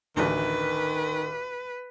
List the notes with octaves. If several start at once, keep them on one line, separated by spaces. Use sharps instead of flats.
A1 D2 D#3 B4